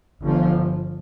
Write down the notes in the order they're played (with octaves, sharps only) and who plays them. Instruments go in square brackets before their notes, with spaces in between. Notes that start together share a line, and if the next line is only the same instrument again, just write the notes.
[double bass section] G1 G2 F3